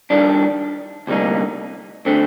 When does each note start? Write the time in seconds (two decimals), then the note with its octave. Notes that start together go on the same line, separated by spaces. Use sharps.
0.10 D#3 G3 D4
1.07 D2 C3 G3 A#3 D#4
2.06 D3 A3 C4